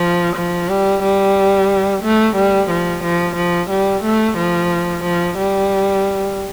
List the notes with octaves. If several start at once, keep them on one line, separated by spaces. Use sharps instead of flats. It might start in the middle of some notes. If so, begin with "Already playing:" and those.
Already playing: F3
F3
G3
G3
A3
G3
F3
F3
F3
G3
A3
F3
F3
G3